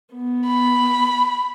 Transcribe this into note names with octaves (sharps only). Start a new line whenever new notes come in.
B3
B5